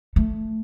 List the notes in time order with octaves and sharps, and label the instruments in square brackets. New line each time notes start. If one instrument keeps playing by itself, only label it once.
[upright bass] A3